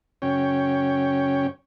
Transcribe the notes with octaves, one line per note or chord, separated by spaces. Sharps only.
F#2 C#3 C#4 C#5 G5